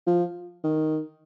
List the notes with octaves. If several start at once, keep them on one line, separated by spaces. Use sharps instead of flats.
F3
D#3